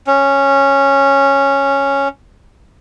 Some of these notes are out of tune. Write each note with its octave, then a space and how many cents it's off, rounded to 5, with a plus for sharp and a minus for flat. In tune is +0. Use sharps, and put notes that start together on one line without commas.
C#4 -5